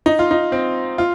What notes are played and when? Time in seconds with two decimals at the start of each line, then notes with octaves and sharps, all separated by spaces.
0.06 D#4
0.19 F4
0.31 D#4
0.52 C4
0.98 F4